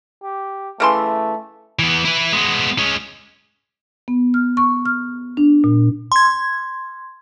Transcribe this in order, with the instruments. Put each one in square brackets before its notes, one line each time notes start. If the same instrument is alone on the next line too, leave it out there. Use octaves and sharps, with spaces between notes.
[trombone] G4
[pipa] C#3 E3 C6 [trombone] A3
[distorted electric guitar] E3 B3
E4 B4
G#3 B3
G#3 C#4
[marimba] B3
F6
C#6
F6
D4
A#2
[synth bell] C6 G#6